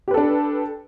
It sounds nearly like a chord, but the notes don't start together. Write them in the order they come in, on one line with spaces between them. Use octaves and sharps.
G4 B4 A4 D4